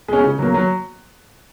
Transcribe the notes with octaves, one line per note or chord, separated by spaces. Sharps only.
G#3 C#4
C#3
F#3 A#3
F#3